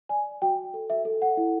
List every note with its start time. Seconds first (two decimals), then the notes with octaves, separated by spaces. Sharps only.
0.09 D5 G#5
0.42 F#4 G5
0.74 A4
0.90 E5
1.05 A4
1.22 F#5
1.37 E4